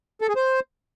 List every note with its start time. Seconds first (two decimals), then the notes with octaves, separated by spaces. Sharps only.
0.21 A4
0.29 G#4
0.36 C5